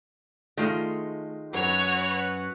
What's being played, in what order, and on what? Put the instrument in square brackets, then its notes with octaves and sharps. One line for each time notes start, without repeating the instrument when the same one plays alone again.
[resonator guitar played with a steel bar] D#3 G#3 F4 [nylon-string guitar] A3
[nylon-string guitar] F#2 [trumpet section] F#4 B4 [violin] C#5 F7